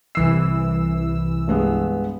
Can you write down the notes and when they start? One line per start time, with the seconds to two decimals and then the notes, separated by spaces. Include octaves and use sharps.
0.15 C2 E3 E6 C7
1.48 G2 G#3 B3